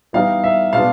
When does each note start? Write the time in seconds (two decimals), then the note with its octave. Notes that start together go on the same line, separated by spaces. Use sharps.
0.13 E3 G3 B3 D#4 F5
0.44 E5
0.73 B2 G#3 B3 D4 F5